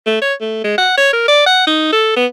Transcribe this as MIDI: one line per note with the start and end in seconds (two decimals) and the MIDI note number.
0.07 0.18 57
0.22 0.33 73
0.41 0.59 57
0.64 0.74 56
0.78 0.96 78
0.97 1.11 73
1.13 1.25 70
1.28 1.43 74
1.46 1.63 78
1.67 1.88 63
1.92 2.13 69
2.16 2.26 59